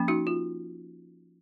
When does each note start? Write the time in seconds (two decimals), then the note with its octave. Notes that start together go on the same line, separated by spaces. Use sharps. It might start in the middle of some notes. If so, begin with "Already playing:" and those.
Already playing: F3 A#3 C#4
0.08 D#4 F#4
0.27 F4